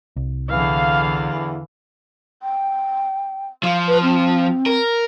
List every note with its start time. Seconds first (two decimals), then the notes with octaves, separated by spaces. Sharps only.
0.16 C2
0.49 E2 D3 E3 F5
2.43 G5
3.63 F3 F5
3.87 B4
4.03 C4
4.66 A#4